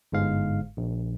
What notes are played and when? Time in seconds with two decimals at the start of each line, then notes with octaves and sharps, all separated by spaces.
0.12 G1 G#2 G#3 F5
0.77 A#1